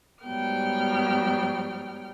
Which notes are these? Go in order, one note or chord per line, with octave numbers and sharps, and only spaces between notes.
G#2 F#3 G3 B3 G5 F6